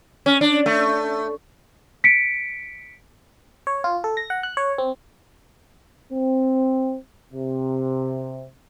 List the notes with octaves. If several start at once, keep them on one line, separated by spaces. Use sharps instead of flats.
C#4
D4
A3
B6 C#7 D7
C#5
F4
A4
A#6
F#5
F#6
C#5
C4
C4
C3